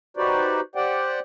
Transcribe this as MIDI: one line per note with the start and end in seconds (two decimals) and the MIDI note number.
0.17 0.61 63
0.17 0.61 66
0.17 0.61 67
0.17 0.61 71
0.17 0.61 72
0.17 0.61 74
0.75 1.20 67
0.75 1.20 72
0.75 1.20 74
0.75 1.20 78
0.75 1.20 79